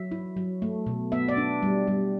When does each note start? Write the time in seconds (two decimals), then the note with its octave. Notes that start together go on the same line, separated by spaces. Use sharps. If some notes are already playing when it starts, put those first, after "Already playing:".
Already playing: F#3 E5
0.12 E4
0.37 F#3
0.62 A3
0.86 B2
1.12 B3 E5
1.28 D5
1.37 D4
1.63 G3
1.87 G3